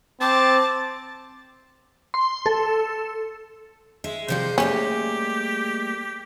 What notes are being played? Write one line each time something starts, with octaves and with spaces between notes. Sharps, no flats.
C4 A5 D6
C6
A4
G#3 E5
C3 F3 G3 C5
G3 A3 A#3 C#4 G4